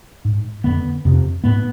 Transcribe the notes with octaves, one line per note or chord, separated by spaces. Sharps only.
G#2
F2 D3 B3
F2 C3
G#2 B3